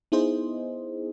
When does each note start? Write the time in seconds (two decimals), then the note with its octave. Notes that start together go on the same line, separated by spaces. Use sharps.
0.12 B3 D#4 E4 G#4 C5 D#5